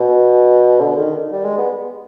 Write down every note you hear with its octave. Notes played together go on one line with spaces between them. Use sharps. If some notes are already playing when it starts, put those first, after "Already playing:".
Already playing: B2
D3
D#3
G3
G#3
B3